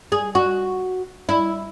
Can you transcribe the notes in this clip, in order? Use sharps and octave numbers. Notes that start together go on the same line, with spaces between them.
G#4
F#4
E4